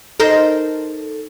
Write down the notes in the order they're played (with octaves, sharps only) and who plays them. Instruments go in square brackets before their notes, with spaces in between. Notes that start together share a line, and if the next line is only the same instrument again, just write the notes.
[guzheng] D#4 A#4 C5 [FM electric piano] A4